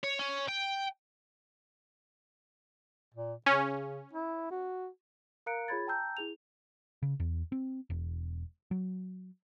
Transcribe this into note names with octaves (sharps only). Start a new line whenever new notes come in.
C#5
C#4
G5
A#2
C#3 C#4
E4
F#4
A#4 F5 A#5 F#6 C#7 D7
F4 G#4 C#5 B5 G#6 A6
G5 A5 A#5 E6 G6
E4 G#4 F7
C#3
E2
C4
E1
F#3